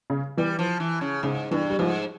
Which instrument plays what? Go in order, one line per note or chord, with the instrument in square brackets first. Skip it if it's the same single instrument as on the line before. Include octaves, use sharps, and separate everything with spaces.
[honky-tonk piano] C#3
[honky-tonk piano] E3 [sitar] G3
[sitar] F3
E3
C#3
[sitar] G#2 [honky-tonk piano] C#3
[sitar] G2 [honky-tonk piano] E3
[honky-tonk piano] G3
[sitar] G#2 [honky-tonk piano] F3